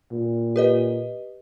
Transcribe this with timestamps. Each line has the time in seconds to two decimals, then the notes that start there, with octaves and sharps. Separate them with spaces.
0.12 A#2
0.56 G4 B4 D#5